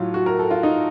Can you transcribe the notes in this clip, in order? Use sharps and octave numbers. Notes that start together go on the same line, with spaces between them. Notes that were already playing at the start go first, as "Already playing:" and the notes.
Already playing: A2 F#3 F4
F#4
A#4
A4
F4
D#4